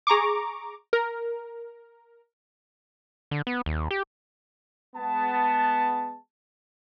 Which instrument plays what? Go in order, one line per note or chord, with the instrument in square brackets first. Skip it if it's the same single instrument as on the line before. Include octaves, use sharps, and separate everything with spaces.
[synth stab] G#4 A#5 C#6 D6
A#4
[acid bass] D3
B3
D#2
G4
[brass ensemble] G#3 B3 A5